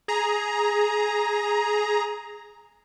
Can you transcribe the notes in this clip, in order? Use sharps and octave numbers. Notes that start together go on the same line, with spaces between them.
G#4 A#5